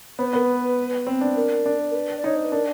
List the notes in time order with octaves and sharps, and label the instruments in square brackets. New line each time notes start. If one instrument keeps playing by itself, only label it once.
[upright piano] B3 [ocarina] C5
[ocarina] B4
[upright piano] B3 [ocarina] A#4
[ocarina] B4
[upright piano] C4
D4
[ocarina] A#4
[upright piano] D4
[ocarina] A#4
B4
D5
[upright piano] D#4 [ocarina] C#5
[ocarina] C5
B4
[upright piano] D4 [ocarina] A#4